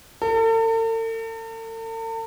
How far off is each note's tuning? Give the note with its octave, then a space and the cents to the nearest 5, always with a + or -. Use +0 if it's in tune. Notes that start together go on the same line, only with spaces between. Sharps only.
A4 +45